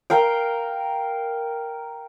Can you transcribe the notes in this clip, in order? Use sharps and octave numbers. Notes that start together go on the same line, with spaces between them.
A#4 F5 G5